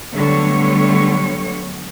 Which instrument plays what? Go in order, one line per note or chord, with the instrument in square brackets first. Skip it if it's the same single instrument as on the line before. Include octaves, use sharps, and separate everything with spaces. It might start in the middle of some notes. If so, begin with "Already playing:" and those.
[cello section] D3 F#3 G3 A3 B3 C#5